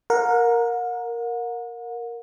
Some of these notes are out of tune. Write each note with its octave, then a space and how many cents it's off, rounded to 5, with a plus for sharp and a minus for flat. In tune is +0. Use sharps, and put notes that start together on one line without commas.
A#4 +0 F#5 -40